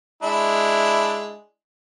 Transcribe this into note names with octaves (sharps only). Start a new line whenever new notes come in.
G#3 D4 E4